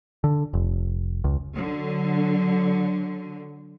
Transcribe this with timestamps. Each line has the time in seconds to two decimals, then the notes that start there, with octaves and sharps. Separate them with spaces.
0.24 D3
0.54 F1
1.24 C#2
1.55 D3 F#3